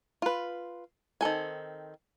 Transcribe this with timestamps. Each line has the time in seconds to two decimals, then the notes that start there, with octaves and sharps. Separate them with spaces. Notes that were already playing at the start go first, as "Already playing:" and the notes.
0.22 F4 B4
1.21 D#3 C4 A4 G#5